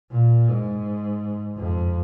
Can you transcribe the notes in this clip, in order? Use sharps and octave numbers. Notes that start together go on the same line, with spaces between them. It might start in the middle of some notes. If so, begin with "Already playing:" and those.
A#2
G#2
F2